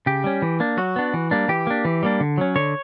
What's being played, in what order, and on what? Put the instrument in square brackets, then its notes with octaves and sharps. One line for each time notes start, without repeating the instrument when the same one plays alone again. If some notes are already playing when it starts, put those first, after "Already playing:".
[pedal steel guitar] C#3 G4
G3 C#4
E3
A#3 D4
F#3 F#4
B3 D4
E3
G3 A#3 D4
E3 G4
A#3 D4
E3
G3 A#3 D4
D3
F#3 C#4
D3 C#5